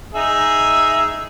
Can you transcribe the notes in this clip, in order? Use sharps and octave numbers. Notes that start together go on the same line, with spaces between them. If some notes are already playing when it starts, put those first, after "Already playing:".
D#4 G#4 E5